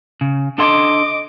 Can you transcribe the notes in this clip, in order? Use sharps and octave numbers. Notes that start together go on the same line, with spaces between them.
C#3
D4 A4 D#5 C6 D6